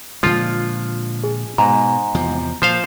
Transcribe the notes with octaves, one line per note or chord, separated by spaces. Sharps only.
A#2 D3 F3 G#3 F4
G#4
G#2 B2 A#5
E2 C3 F3
A#2 F3 C5 F5